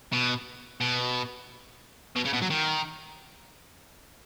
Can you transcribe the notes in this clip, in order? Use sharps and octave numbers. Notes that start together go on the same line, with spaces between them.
B2
B2
B2
C#3
B2
F#3
D#3